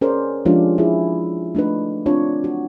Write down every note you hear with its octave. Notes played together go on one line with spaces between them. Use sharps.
C#4 G#4 A#4 C5 D5
F3 G#3 C#4 D4 F4 G4
E4 G#4
A3 D4 D#4 B4
C4 D4 F4 C#5
F#4